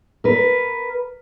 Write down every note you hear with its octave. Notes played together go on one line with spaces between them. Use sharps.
A#4 B4